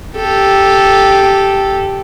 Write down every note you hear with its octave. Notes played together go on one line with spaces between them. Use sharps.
G4 A4